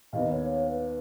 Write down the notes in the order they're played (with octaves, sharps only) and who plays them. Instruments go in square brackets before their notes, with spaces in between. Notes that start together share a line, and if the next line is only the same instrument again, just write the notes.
[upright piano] D#2 D#3 B3 [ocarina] D#5
[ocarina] C#5
C#5
B4